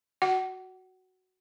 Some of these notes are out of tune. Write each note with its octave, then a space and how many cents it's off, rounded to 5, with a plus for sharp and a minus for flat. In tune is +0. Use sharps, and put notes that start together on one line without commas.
F#4 +0 F#5 +30